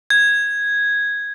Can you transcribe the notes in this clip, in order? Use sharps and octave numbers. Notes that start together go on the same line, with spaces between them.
G#6